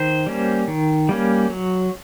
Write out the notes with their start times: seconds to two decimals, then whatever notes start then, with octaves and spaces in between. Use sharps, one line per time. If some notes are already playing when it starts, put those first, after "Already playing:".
Already playing: D#3 C5
0.26 G3 A#3 C#4
0.68 D#3
1.09 G3 A#3 C#4
1.50 F#3